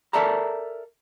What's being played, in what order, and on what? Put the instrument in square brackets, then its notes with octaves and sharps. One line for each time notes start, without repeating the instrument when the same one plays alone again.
[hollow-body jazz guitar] A4 A#4 D5 E5 A5 A#5